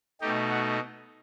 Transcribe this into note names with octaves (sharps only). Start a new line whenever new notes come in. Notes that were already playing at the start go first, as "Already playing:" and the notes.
B2 A3 D#4 G4
F#4